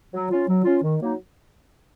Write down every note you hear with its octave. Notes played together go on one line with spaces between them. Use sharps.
F#3
C#4 F4
F#3
C#4 F4
D#3
F#3 A#3 D#4